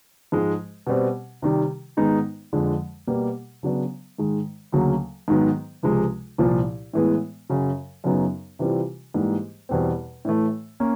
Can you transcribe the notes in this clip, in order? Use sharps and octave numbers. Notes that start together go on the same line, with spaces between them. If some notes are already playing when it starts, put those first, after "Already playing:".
G#2 F3 G#3
B2 G3 C4
C3 D#3 G3
G#2 D#3 G#3 B3 D#4
F2 D3 F3 G#3
B2 G3 A#3
C#3 F#3 B3 D4
G#2 D#3 G#3
D2 C#3 F#3 A#3
G#2 D#3 F#3 B3
C#2 C3 F3 G#3
C2 A#2 F3
A2 E3 G#3 B3
F#2 C#3 F#3
F#2 C#3 F#3 B3 D#4
C3 E3 G3 C4 F4
G#2 E3 G3 A#3
E2 B2 G3 C4
A2 E3 A3
A#3 C#4